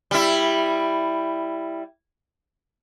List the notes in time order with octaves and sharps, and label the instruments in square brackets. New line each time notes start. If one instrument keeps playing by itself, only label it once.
[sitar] G3 E4